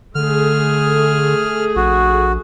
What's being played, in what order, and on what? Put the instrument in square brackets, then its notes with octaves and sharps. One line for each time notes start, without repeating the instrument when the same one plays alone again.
[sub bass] D3 [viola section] A3 G#4 [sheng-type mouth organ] F6
[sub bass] A#1 [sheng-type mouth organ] F#4